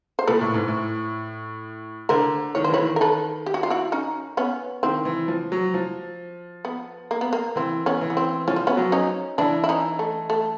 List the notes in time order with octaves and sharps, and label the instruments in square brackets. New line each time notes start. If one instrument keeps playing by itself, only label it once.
[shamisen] C5
[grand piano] A#2 [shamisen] A4 B4
[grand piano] A2
G#2
A2
[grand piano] D3 [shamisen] A#4 C5
[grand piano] D#3 [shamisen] C#5
[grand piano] E3 [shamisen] C5
[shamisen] B4 C#5
[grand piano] D#3
[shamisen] A#4
A4 B4
G4
F#4
F4
E4 F#4
C#4 D#4
B3 C#4
[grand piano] D#3 [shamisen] C4
[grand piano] E3
F3
F#3
F3
[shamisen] B3
A#3
B3
A#3
[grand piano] E3 [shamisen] C4
[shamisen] B3 C#4
[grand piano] E3
[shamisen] B3
C4
[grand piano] F3 [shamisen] C#4
[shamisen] C4
B3 C#4
[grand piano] F#3
[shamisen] C#4 D#4
[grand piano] E3 [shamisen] D4 E4
[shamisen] E4
C#4 D#4
A3
A3